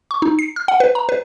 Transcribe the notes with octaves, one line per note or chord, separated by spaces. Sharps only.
C#6
D#4
C7
F6
F#5
B4
A#5
B4